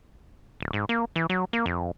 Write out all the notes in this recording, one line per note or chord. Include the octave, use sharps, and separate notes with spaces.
D1
G#2
A#3
E3
F#3
A#3
F2